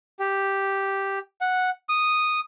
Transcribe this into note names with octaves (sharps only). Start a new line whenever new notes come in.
G4
F#5
D#6